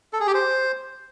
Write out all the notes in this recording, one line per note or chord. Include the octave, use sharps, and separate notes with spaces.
A4
G#4
G4
C5